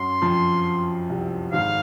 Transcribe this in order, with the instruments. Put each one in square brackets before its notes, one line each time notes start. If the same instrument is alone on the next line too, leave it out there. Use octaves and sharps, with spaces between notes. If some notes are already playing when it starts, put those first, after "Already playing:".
Already playing: [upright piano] F#2 F#3 [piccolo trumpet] C6
[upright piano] F2 F3
C2 C3
[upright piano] G#1 G#2 [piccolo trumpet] F5